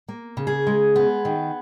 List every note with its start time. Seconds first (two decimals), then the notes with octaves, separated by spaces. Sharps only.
0.08 A#3
0.37 C#3
0.47 G#4
0.67 G#3
0.96 B3
1.25 D#3